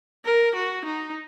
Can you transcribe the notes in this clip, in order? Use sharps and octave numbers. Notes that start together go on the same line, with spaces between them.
A#4
F#4
D#4